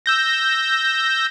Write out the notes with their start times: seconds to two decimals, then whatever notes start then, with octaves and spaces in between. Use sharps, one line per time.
0.06 E6 G6 A#6